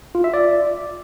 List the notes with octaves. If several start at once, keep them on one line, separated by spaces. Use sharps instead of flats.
F4
E5
D5